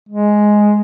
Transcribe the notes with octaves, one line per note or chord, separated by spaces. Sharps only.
G#3